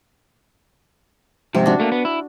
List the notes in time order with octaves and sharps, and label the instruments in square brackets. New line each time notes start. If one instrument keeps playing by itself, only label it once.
[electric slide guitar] F2 G#2 [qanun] C3
[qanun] D4 F#4
[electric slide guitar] A3 A#3
B3
E4